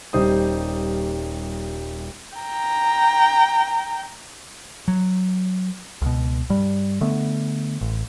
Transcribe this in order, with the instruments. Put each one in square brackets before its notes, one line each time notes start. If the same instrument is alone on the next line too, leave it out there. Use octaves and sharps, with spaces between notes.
[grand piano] D#1 G3 D#4 C5 D#6
[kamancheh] G5 A#5
[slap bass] F#3
[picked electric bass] C#2 B2
G2 G3
D3 A3 B3
A1